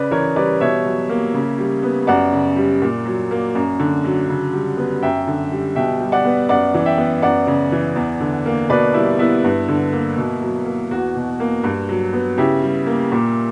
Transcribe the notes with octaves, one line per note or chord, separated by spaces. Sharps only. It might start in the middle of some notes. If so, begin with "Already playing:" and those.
Already playing: C#3 B4 D5
E3 A#4 C#5
G3 B4 D5
B2 C#5 E5
F#3
A#3
C#3
G3
B3
F#2 D5 F#5
C#3
G3
A#2
F#3
A#3
F#2
D3
F#3
C#3
G3
B3
F#2 E5 G5
D3
G3
B2 E5 G5
G3
D5 F#5
B3
F#2 D5 F#5
E3
E5 G5
B3
F#2 D5 F#5
C#3
E3
E2
D3
A#3
B2 B4 D5
G3 E4
B3 E4
G2
D3
A#3
B2
F#3
A#3
E2 F#4
B2
A#3
G2
F#3
B3
C#3 E4 G4
G3
A#3
A#2